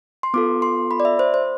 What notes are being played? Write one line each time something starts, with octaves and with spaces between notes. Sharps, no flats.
C6
B3 F4 A4 D6
C6
B5
D5
E5
C5
C5